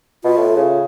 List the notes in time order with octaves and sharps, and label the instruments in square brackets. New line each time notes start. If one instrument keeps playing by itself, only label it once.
[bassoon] B2 [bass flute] F4
[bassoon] A2
C#3